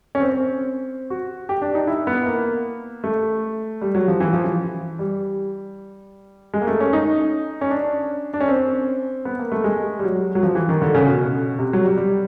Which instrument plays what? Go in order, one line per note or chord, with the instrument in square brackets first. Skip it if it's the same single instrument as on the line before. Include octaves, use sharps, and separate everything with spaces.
[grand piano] C#4
C4
C4
F#4
G4
D4
D#4
E4
B3
A#3
A3
G3
F#3
F3
E3
F3
E3
G3
G#3
A#3
A3
C#4
D#4
C#4
D4
D4
C#4
C4
B3
A#3
A3
G#3
G3
F#3
F#3
F3
E3
D#3
D3
C#3
B2
C3
F#3
G3
G3